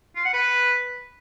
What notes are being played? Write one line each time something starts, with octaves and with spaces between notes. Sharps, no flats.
F4
F#5
B4